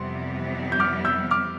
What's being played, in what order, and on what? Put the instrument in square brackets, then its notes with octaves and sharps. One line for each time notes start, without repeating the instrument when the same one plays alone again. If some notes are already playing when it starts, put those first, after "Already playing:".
Already playing: [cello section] F2 C3 E3 G3 B3 [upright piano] C6
[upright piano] G6
D6 F6
E6 G6
D6 F6